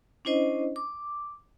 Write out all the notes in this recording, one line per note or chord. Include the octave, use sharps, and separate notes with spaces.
C#4 D4 E4 C5 D#5
D6